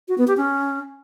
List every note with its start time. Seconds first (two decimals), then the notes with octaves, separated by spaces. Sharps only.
0.08 F#4
0.18 B3
0.28 G4
0.37 C#4